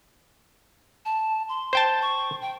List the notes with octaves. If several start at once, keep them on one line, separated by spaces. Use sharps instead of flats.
A5
C6
C5 G5 A5
C#6
G5